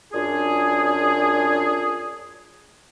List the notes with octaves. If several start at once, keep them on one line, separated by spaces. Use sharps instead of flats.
F#2 D4 F4 G#4